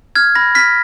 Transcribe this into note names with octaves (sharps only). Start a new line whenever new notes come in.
F6 G#6
B5 A#6
F6 B6